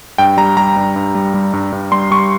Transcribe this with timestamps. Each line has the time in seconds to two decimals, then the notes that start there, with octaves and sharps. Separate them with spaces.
0.18 G2 G5
0.37 G3 A#5
0.57 G3 A#5
0.76 G2
0.96 G2
1.15 G3
1.34 G3
1.53 G2
1.72 G2
1.92 G3 C6
2.11 G3 C#6